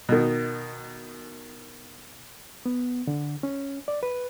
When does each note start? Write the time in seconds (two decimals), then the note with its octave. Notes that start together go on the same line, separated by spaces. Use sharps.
0.09 B2 D#3
2.66 B3
3.07 D3
3.43 C#4
3.88 D5
4.03 B4